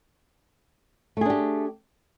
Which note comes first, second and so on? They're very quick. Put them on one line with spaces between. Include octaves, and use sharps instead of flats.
A3 G#4 D4 G4